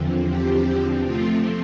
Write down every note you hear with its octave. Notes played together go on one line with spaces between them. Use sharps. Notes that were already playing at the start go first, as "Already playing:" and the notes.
Already playing: E2 D3 F3 C4
G4
C3 F3 A3 C4 F4